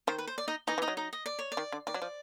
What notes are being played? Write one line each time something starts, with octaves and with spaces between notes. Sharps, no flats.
D#3 C5
B4
C5
D5
D#4 D#5
E3 D#4 D#5
E3
D#4 D#5
F#3
D#4 D#5
D#5
D5
C#5
D5
D#3
D3
D#3 D5
F#3
F3